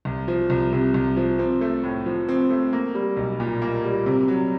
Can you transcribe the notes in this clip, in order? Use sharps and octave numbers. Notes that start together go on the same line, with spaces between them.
C2
F3
C2
C3
C2
F3
C4
A3
A2
F3
C4
A3
A#3
G3
B1
A#2
A#3
G3
C3
F#3